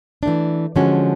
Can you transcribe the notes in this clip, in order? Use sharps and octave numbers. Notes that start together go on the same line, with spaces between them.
E3 A3 D4
D3 F3 G#3 C#4 F#4